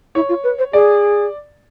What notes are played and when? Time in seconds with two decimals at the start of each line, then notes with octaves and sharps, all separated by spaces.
0.15 E4 C#5
0.29 F4
0.44 B4
0.58 C5
0.73 G#4 D5